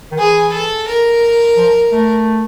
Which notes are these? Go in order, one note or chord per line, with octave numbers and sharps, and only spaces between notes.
D#3
E3 G#4
A4
A#4
F3
A3